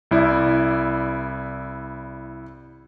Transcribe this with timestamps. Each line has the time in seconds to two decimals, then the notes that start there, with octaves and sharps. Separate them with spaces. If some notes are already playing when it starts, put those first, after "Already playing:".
0.11 C2 E4 D5